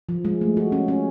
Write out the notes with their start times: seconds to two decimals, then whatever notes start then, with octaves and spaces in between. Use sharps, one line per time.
0.09 F3
0.25 G#3
0.41 A3
0.57 F#4
0.72 C#4
0.88 C#4